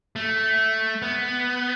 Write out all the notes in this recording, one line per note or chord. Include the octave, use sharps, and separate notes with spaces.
A3
B3